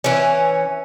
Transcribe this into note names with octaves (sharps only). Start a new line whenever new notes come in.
E3 C#4